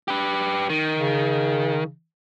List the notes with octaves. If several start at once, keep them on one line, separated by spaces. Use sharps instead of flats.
G4 B4
D#3
C#3